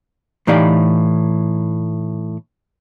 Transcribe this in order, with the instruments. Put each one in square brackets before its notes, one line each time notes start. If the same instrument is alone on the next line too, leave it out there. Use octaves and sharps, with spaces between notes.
[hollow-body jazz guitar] A2 E3 D#4 G4 D5 F5